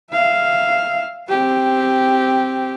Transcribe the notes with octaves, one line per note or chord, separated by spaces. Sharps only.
E5 F5
C4 G4